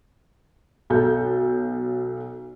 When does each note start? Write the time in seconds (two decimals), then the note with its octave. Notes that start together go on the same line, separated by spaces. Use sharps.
0.90 B1 A4 G6